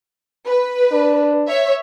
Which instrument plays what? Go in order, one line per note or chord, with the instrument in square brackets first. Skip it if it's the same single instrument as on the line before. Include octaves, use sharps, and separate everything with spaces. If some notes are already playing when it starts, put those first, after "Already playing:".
[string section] B4
[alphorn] D4
[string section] C#5 E5